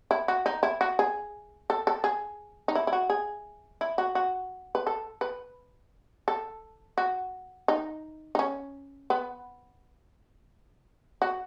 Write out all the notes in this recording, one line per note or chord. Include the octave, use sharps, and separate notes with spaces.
E4
F#4
D#4
E4
F#4
G#4
A4
A4
G#4
D#4
E4
E4
F#4
G#4
E4
F#4
F#4
B4
A4
B4
A4
F#4
D#4
D#4
C#4
B3
F#4